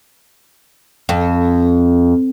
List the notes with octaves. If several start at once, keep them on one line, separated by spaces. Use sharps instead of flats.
F2